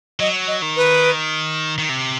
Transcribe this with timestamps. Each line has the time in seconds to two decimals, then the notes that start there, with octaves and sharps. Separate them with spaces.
0.20 F#3 D#5
0.48 D#5
0.62 D#3
0.76 B4
1.78 D#3
1.89 C3